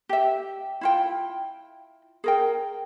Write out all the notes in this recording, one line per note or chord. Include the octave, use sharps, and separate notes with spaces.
G4 E5
E4 F4 G5
G#4 A#4 G5